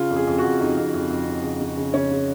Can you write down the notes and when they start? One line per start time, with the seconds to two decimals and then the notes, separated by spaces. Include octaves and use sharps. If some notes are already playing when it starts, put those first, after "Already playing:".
Already playing: C#3 F4
0.10 F2
0.16 G#4
0.27 F2
0.38 F#4
0.44 F2
0.60 F2 D#4
0.77 F2
0.94 F2
1.10 F2
1.27 C#3
1.43 C#3
1.61 C#3
1.77 C#3
1.93 C#3 C#4
2.11 C#3